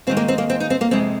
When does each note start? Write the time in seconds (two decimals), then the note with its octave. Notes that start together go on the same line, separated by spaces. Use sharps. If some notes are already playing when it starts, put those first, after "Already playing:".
0.07 D#2 D#3 G#3 C4
0.17 A#3
0.28 C4
0.38 A#3
0.50 C4
0.60 D#4
0.70 C4
0.81 A#3
0.91 F2 C3 G#3 C4